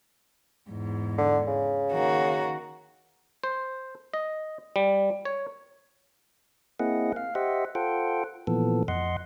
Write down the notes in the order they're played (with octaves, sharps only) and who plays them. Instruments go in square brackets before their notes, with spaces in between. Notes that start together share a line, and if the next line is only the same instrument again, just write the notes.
[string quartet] E2 G#2
[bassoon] D3
C#3
[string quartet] D#3 A#3 F#4
[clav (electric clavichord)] C5
D#5
G3
C#5
[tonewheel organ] A#3 C4 E4 G#4 D#5 F#5
F5
G4 C5 D#5 E5 F#5
F4 A4 C5 F#5 G5
A#2 E3 F3 B3 A4
F2 D#5 F#5 C6